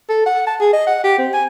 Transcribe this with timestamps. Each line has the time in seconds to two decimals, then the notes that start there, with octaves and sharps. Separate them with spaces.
0.09 A4
0.26 F#5
0.47 A5
0.60 G#4
0.73 D#5
0.87 F#5
1.04 G4
1.18 C4
1.34 G#5